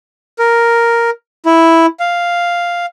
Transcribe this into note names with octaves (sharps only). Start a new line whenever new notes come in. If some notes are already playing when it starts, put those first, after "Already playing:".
A#4
E4
F5